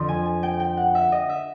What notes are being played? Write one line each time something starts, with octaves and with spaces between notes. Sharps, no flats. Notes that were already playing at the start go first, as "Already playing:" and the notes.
Already playing: F2 D3 F3
G#5
G#5
G5
G5
F#5
E5
D#5
E5